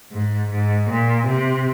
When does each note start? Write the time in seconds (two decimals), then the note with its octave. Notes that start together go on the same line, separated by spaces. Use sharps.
0.11 G#2
0.49 G#2
0.87 A#2
1.26 C3